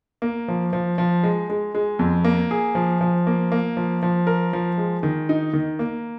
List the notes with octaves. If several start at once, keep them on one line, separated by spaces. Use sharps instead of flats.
A#3
F3
F3
F3
G#3
G#3
G#3
F2
A#3
G#4
F3
F3
A#3
A#3
F3
F3
A#4
F3
G#3
D#3
D#4
D#3
A#3